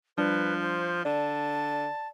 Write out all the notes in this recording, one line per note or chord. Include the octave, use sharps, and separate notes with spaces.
F3 G3 D4 B4
C5
D3 D5 A5